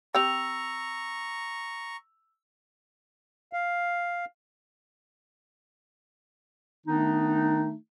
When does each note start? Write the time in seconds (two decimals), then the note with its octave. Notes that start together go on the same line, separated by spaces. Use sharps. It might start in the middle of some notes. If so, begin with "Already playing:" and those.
0.15 C4 G4 G5 A#5 C#6 E6 F7
3.53 F5
6.86 D#3 A3 B3 D4 D#4